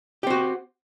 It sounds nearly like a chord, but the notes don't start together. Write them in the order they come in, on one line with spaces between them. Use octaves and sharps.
G4 C4 F#4